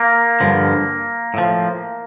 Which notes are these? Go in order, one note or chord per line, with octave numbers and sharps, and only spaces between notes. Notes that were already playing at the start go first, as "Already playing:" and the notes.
Already playing: A#3
G2 D3 F3
A2 F3